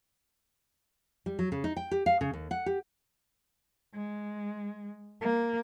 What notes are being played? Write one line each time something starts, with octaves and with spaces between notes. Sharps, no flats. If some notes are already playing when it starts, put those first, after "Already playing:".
G3
F#3
C#3
D#4
G5
G4
F5
C#3
D#2
F#5
G4
G#3
A#3